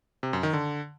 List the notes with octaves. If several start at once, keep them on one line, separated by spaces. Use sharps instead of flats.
C3
F#2
D#3
D3